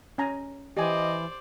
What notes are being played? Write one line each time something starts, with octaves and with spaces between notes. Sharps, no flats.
C#4 G#5 A#5
E3 G4 C5 D5 D#5 G#5